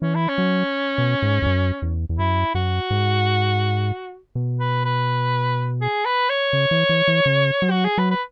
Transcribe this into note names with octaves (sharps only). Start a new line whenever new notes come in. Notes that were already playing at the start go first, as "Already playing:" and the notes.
E3 C#4
E4
C#4
F#3
B2
G#2
E2
F#2
E2
E2
F#2 E4
F#2 F#4
G#2
B2
B4
B4
G#4
B4
C#5
C#3
E3
E3
E3
C#3
F#3
F#4
G#4
F#3 B4
B4